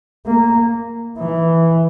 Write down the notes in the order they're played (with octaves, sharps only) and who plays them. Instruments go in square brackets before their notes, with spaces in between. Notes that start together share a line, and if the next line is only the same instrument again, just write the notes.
[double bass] A#3
E3